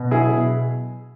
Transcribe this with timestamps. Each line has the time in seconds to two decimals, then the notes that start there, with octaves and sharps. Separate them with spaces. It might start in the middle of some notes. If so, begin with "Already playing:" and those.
Already playing: B2
0.11 F#3 E4 G#4
0.31 B2